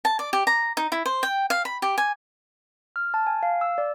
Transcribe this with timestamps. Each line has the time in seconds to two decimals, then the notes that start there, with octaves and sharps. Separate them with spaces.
0.05 A5
0.19 D5
0.33 G4
0.47 A#5
0.77 D#4
0.92 E4
1.06 C5
1.23 G5
1.50 F5
1.65 B5
1.82 G4
1.98 G#5
2.96 F6
3.14 A5
3.27 G#5
3.43 F5
3.61 E6
3.78 D5